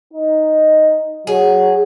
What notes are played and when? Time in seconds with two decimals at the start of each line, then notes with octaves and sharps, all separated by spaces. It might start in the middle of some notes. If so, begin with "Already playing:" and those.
0.13 D#4
1.27 F#3 G#4